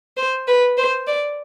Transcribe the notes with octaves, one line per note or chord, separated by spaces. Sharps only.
C5
B4
C5
D5